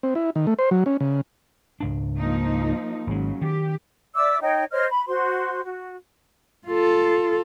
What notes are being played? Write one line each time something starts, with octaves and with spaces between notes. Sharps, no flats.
C4
E4
D#3
A3
C5
F#3
C#4
C#3
C#2 G#2 D4
F3 A#3 D#4
G#1 C#3 F#3 G#3
D#3 G4
D5 E5 D6 E6
D#4 C#5 D#5 G5
C5 C#5 D#5 F6
B5
F#4 C5 C6
F#4
F4 A4